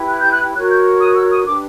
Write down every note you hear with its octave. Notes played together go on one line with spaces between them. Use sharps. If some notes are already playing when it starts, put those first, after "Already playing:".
Already playing: E4 G4 B4
F#6
G6
F#6
F#4 A#4 C#5 F#6
G6
D#6
E6
D#6
D4 G4 B4 D6